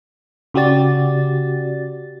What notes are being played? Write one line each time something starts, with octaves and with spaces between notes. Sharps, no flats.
C#3 F#4 G4 D5 A6